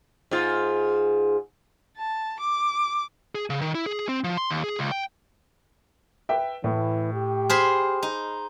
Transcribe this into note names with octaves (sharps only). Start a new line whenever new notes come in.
G#2 F4
A5
D6
G#4
C#3
D#3
E4
G#4
C4
F3
C6
D#2
G#4
C#2
G5
B4 E5 G5
A2 E3 A3
G4
G#4 C5 B5 F6
D#4